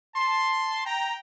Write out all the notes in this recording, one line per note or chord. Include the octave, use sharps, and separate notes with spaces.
A5 C6
G5 A#5